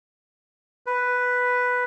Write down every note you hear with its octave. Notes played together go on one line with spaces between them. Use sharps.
B4